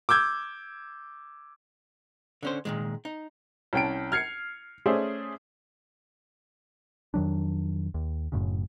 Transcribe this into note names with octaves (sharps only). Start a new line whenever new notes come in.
D6 E6 G6 G#6
D3 C#4 C5
A#2 D#3 G#3
D#4
C2 C#4 G5 A5 D7
F6 G#6 C7 C#7
A3 C#4 G#4 C5 D5 E5
F2 D#3 F#3 D4
D#2
F#1 F#2 A2 C#3